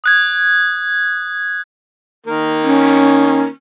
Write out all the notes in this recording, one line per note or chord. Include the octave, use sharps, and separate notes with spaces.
D#6 F#6 G#6
D#3 A#3 A#4
C#4